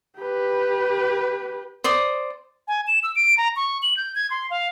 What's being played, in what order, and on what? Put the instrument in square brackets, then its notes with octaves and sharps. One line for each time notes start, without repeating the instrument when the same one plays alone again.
[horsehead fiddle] G4 B4
[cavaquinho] C5 D5 D#6
[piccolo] G#5
E7
E6
D7
A#5
C#6
F#7
G6
G#6
C6
F5